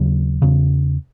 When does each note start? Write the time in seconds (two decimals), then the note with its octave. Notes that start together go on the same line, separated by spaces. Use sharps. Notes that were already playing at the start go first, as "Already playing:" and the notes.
Already playing: D#2 C#3 F#3
0.42 E2 C#3